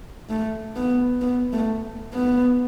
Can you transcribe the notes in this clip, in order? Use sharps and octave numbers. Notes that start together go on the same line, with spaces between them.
A3
B3
B3
A3
B3